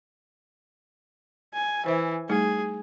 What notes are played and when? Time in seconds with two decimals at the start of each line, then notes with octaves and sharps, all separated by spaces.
1.54 G#5
1.86 E3 C5 E5
2.30 G3 A3 D#4 G#4